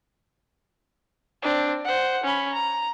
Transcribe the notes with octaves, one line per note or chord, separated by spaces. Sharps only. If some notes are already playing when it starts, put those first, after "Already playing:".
C4 D4
C5 F#5
C#4 B5
A#5